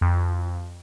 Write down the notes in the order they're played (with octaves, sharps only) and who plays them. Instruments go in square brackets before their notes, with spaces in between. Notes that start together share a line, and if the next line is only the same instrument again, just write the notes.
[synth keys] F2